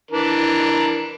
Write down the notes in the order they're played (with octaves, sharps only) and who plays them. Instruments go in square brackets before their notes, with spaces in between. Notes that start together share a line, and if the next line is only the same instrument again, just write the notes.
[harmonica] E3 D4 A#4